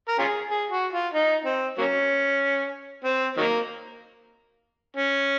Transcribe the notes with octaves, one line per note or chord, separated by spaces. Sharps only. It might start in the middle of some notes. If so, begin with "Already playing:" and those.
A#4
C#4 F4 G#4
G#4
F#4
F4
D#4
C4
F#3 A#3 C#4
C4
D#3 F#3 A#3
C#4